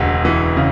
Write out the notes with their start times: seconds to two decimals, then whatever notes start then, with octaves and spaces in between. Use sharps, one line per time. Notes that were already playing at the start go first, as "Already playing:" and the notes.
Already playing: E1 D2 C#3
0.25 E3
0.57 C#3